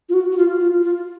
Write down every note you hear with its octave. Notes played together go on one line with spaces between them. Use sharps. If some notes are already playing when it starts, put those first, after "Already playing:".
F4
F#4
F#4
F4
F4
F4